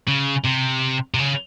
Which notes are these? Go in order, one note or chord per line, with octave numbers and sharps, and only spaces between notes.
C#3
C3
C3
C#3